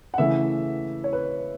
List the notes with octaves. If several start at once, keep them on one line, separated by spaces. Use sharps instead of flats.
F#5
C#3 E3 A3 E4 E5
C#5
B4